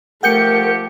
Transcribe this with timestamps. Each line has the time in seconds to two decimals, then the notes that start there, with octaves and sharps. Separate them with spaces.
0.23 F3 A3 G4 A#4 F#5 G6 C#7